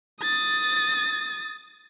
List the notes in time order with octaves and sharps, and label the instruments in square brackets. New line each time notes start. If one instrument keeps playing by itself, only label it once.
[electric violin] D#6 A6